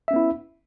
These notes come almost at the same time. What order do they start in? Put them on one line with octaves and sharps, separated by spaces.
E5 C#4 B3 E4